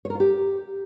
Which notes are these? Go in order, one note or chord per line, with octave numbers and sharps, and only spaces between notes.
C#5
A#4
F4
G4